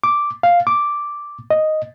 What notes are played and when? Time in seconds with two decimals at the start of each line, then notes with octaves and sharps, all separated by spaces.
0.04 D6
0.43 F5
0.67 D6
1.50 D#5